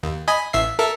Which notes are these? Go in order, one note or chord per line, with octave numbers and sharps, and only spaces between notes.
D#2
D#5 G#5 B5
A1 E5 C7
A4 A#4 E5